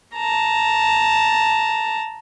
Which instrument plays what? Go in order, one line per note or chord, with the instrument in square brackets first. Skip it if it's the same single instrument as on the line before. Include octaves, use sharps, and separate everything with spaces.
[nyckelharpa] A5 A#5